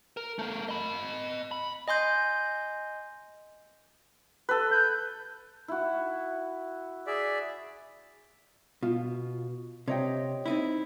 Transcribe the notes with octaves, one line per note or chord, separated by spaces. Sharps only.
A#4
A3 A#4
D#5 B5
B5
D#5 G#5 C6 G6
A4 B4
G6
E4 F#4
G#4 D5 E5
B2 F4
C3 C#5 D#5 G5
C4 D#4 E4